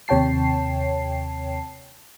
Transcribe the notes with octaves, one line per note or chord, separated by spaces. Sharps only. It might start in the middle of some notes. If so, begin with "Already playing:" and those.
D#2 C3 C#5 G5 A5 C7